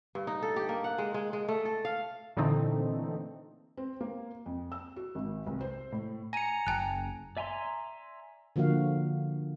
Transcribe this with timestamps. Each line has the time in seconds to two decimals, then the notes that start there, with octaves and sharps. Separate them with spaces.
0.15 G2
0.27 D#4
0.42 A4
0.56 G4
0.69 A#3
0.84 F#5
0.98 G#3
1.14 G#3
1.33 G#3
1.48 A3
1.65 A4
1.85 F5
2.37 A#2 D3 E3 A3 C4 D#4
3.77 C4
4.01 A#3
4.46 F2
4.72 E6
4.96 F#4
5.15 G#1
5.47 C2
5.61 C5
5.92 A2
6.33 G#5 A#5 A#6 C#7 D#7
6.67 F#1 G5 A5 F#6
7.37 D5 E5 G#5 A#5 C6
8.56 D3 F3 A#3 F#4 F5